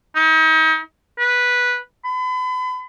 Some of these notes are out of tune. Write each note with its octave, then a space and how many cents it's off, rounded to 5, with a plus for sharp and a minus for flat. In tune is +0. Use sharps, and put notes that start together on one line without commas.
D#4 +40
B4 -10
B5 +40